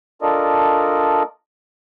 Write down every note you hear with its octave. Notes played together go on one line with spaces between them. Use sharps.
D4 F4 A4 A#4 D5 D#5